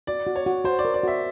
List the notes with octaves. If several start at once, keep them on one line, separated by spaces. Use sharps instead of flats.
F#4 D5
F#4
C#5
F#4
F#4 C5
D5
A#4
D5
F#4 E5